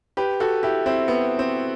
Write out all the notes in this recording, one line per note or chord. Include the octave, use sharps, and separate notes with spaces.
G4 B4
F#4 A4
E4 G4
C4 E4
B3
C4